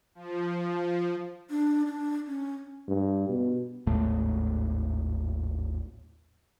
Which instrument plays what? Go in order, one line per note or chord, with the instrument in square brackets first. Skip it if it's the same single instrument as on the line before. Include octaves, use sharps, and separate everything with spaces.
[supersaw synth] F3
[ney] D4
D4
C#4
[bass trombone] G2
B2
[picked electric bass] G#1 D#2 A2 A3